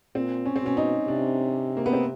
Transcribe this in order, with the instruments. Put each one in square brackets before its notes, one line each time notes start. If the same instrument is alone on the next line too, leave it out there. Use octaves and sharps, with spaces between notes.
[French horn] A#2 [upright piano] C4
[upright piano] C#4
C4
[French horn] B2 [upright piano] C#4
[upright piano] D#4
[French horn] C3 [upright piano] D4
[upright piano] A#3
B3
C4